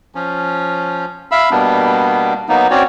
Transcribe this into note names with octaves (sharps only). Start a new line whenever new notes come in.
F3 C#4
E5 F5 B5 E6
B2 G3 A#3 B3 D4
F#3 A#3 B3 D#4
C4 C#4 F#4 C#5 D5